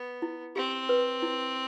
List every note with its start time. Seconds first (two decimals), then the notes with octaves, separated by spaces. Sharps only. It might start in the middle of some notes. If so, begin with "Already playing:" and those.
Already playing: B3
0.22 E4
0.56 C4 G4
0.89 B4
1.22 E4